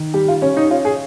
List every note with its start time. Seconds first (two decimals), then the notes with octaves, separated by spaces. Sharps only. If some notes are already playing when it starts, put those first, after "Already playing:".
Already playing: D#3
0.14 G3 G4
0.28 F4
0.42 C#4
0.57 D#4
0.71 C#4 F4
0.85 G#4